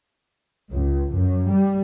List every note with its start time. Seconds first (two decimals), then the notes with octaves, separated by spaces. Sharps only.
0.74 C#2
1.12 F#2
1.50 G3